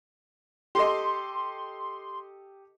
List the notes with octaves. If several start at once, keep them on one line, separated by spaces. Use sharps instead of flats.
G4 A4 D#5 C6